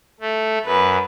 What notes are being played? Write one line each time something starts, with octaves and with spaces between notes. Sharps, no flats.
A3
F#2 B4